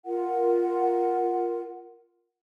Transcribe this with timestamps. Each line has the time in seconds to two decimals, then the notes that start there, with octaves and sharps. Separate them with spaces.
0.05 F4 A#4 F#5